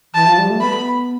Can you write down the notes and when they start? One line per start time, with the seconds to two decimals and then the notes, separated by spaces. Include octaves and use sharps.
0.14 E3 A5
0.26 F3
0.38 G3
0.50 A3
0.61 B3 B5